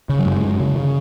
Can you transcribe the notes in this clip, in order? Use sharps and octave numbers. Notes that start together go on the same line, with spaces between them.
C#3
F#3
F#2 G#3
F#2
C#3
C#3